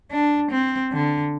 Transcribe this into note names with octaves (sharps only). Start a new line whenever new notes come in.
D4
C4
D3